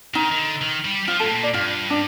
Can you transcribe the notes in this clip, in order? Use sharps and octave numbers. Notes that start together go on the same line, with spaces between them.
D#3 D#4
D#3
D3
D#3
G3
F3 F4
A2 A4
A#2
D5
G2 F4
D4